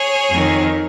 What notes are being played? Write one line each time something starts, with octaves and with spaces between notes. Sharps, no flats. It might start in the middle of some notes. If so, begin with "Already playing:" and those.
Already playing: G#4 C#5
F2
D#3